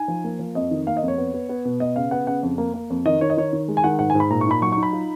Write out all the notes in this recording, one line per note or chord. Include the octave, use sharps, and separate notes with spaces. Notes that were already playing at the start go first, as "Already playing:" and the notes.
Already playing: D#4 G#5
F3
A#3
F3
F2 D#5
D#3
A#3 F5
D#5
F2
C#5
B3
B3
B3
B2
B3 D#5
C#3 F5
B3 F#5
C#3 F#5
F2
A#3
A#3
F2
D#3 D#5
D#3 C#5
D#5
D#3 C#5
D#3
G#3
G#5
D#3 F#5
G#2 F#5
G#5
G#2
B5
A#2 A#5
C#6
D#4 B5
F#3 C#6
C#6
D#4
B5
F4